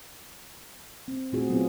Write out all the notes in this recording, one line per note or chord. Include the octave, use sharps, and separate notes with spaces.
C4
A#2 A3 C4 F4 F#4 G#4
F#3 B3 C4 F4 G#4